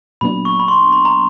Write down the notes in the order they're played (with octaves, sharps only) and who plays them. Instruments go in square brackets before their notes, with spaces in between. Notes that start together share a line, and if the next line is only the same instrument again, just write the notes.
[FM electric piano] A#2 F#3 B3 D4 [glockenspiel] B5
[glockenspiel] C#6
B5
C6
B5
A#5